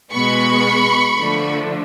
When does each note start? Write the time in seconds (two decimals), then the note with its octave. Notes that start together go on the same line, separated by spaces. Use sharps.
0.12 B2 G#3 B3 B5 C#6
1.17 D3 F3 A3 D4